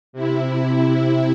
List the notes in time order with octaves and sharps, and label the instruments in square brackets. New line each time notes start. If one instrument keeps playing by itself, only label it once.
[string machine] C3 E4